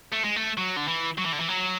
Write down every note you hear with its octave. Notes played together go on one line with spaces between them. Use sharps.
A3
G#3
A3
F#3
D3
E3
F#3
E3
D3
E3
F#3